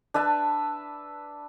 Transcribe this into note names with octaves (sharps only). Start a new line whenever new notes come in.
D4 B4 E5 A5